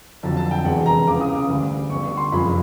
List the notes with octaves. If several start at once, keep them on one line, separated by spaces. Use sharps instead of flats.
F2 D3 F#3 A5
A5
G5
E1 E2 C3 E3 F#5
A#5
C#2 C#3 E3 D6
D#6
D6
D2 D3 G3
G1 G2 D3 C#6
C#6
C6
F#1 F2 C3 F3 G#3 B5